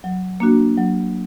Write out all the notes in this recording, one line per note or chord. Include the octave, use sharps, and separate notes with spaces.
F#3
A#3 D4 F#4
F#3